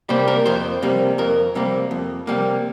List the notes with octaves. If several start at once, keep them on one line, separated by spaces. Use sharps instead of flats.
C3 G3 A#3 C5
A#4
F2 C5
C3 G3 A#3
F2 A#4
C3 G3 A#3
F2
C3 G3 A#3